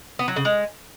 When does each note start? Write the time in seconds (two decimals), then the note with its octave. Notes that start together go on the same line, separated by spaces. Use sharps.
0.19 B3
0.28 F#3
0.36 C#3
0.45 G#3